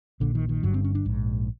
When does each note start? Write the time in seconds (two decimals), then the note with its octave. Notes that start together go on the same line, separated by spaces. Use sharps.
0.20 A#1 A#2 D3
0.35 D#3
0.49 D#3
0.63 G1 G2 D3 F#3
0.74 C4
0.84 C#4
0.95 D4
1.05 A#1 G#2